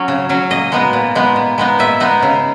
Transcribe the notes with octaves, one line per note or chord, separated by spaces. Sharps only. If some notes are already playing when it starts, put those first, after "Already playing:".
Already playing: F#3 C#4
C#3
F#3 C#4
A#2 D#5
G#3 B3 D#4
A#2
G#3 B3 D#4
A#2
G#3 B3 D#4
A#2 E5
G#3 B3 D#4
C#3